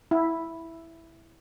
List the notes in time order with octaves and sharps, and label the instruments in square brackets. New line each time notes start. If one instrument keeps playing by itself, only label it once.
[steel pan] E4